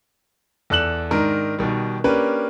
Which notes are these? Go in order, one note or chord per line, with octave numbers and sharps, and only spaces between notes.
E2 A4 D5 F#6 E7 F#7
G#2 D#3 D4 A#4
B2 D#3 G3
A#3 C#4 D4 G4 A#4 B4